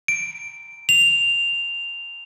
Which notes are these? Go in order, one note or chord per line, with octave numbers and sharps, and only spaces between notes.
D7
F7